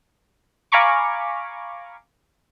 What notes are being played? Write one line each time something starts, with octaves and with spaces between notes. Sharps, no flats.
F5 G#5 A#5 B5 C#6 D6